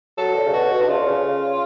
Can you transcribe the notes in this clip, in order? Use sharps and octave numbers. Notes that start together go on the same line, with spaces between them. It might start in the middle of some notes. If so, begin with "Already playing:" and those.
F#3 A4
D3
C#3
B2 F#4
B2
D4
C#3 F4
D3
C#3